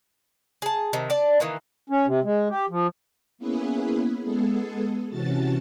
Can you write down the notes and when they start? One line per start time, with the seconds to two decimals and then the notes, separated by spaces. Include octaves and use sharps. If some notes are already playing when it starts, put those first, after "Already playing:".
0.62 G#4 A5
0.93 C3 D#3
1.10 D5 A5
1.40 D#3 E3 A#3
1.90 C#4
2.07 C3
2.24 G#3
2.50 G4
2.70 F3
3.38 A#3 B3 C#4 E4 G#4 B4
4.24 G#3 B3 G#4 A4
5.09 C3 E3 C#4 F#4 A5 A6